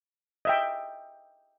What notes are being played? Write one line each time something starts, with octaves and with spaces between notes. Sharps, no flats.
D#5 E5 G5